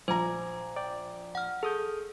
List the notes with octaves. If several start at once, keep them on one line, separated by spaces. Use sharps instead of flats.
A#1 C5 G#5 A#5 D6 G#6
D5 G5
F#5 F6
G#4 A4 D#6 G6